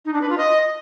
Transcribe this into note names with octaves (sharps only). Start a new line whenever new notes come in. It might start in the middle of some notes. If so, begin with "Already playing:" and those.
D#4
D4
B4
F4
D#5